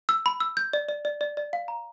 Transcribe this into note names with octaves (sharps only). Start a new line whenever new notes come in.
E6
B5
E6
G6
D5
D5
D5
D5
D5
F5
A#5